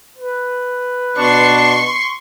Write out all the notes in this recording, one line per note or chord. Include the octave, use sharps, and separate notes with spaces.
B4
B2 D4 C6 C#6